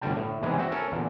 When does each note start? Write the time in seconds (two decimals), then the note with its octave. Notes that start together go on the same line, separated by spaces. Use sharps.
0.01 G1 D2 D3 G3 G5 A5
0.16 A2
0.42 E2 G#2 C3 E3 G#3 B3
0.58 C4 F#4 E5
0.72 C#4 A4 A#4
0.92 E2 A#2 D3